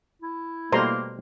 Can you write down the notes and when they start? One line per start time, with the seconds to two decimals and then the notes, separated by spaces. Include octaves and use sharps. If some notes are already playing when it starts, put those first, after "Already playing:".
0.22 E4
0.72 B2 G3 A3 A#3 C5 A#5 C6